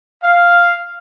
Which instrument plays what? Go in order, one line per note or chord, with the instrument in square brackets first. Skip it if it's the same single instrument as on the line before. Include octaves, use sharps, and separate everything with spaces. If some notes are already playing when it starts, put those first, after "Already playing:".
[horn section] F5